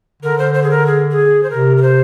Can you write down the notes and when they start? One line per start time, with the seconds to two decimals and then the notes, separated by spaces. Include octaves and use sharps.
0.22 D3 A#4
0.38 C5
0.54 C5
0.63 G#4
0.70 A#4
0.86 G#4
1.11 G#4
1.43 C5
1.50 C3 A#4
1.77 A#4
1.82 C5